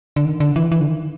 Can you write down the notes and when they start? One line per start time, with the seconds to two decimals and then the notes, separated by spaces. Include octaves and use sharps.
0.16 D3
0.25 D#3
0.40 D3
0.56 E3
0.72 E3
0.80 D3
0.88 D#3